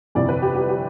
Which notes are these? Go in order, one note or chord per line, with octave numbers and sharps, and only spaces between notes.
G1 F2 C3 E3 D5
B4
G4
G4
G4